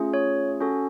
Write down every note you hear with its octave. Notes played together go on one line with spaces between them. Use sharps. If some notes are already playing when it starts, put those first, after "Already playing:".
Already playing: A3 C#4 F4 G#4
C#5
C#4 F#4 A4